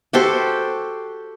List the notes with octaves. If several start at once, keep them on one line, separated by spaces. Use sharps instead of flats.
F#4 G4 A4 C5